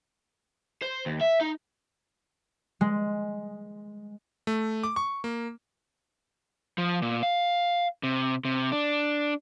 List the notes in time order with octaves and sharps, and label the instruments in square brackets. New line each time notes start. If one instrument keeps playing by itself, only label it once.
[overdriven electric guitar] C5
D#2
E5
D#4
[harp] G#3
[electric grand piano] A3
D6
C#6
A#3
[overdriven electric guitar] F3
A#2
F5
C3
C3
D4